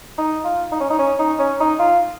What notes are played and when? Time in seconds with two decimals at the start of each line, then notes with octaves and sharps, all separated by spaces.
0.18 D#4
0.44 F4
0.72 D#4
0.80 C#4
0.90 D#4
0.99 C#4
1.19 D#4
1.39 C#4
1.60 D#4
1.79 F4